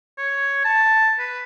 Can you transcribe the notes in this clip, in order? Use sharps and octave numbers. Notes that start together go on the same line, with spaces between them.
C#5
A5
B4